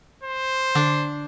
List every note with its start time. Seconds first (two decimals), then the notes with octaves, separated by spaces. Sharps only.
0.23 C5
0.75 D3 D4